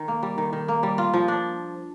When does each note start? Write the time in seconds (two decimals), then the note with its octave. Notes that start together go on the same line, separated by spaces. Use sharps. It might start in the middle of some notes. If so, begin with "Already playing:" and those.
Already playing: D#3
0.08 A#3
0.23 G3
0.38 D#3
0.53 D#3
0.68 A#3
0.83 G3
0.98 F4
1.13 F3
1.28 D4